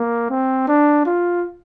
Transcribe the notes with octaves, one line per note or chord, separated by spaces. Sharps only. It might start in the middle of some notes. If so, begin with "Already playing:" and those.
Already playing: A#3
C4
D4
F4